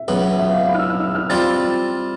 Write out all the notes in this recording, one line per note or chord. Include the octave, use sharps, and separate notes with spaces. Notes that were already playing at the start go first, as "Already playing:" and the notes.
Already playing: E5
C#2 B2 F#3
E5
F5
B5
F6
E6
F6
E6
F6
G3 C4 F4 A6